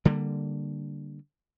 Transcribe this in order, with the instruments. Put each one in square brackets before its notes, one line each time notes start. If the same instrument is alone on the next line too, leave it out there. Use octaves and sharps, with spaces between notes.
[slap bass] D3 G3 A#3